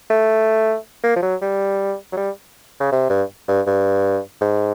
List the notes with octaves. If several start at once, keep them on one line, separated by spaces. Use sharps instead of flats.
A3
A#3
F3
F#3
G3
F#3
G3
C#3
C3
G2
G2
G2
G#2